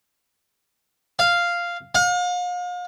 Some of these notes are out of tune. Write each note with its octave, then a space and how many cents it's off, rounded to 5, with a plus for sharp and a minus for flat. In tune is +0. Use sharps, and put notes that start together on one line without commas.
F5 -5
F5 +40